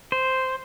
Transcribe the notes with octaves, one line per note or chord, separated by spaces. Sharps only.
C5